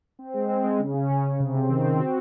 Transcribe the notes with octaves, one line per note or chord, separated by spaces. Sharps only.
C4
G#3
C4
G#3
C#3
C#4
C#3
C#3
C3
C4
D#3
C4
F#4